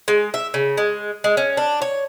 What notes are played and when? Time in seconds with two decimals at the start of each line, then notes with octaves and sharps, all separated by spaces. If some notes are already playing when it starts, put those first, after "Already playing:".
0.08 G#3
0.34 E5
0.54 C#3
0.77 G#3
1.24 G#3
1.37 C#4
1.57 D4
1.82 C#5